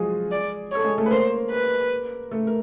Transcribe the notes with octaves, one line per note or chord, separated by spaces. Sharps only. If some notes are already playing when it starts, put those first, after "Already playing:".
Already playing: F3 F#3 G#3 F4 F#4 G#4
D5
A4 C#5
G#3 G#4
A3 A4
B4
A#3 A#4 C5
B4
A3 A4
A#4